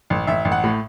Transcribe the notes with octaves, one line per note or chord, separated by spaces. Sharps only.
A1
A1 E5
A1
F#5
A2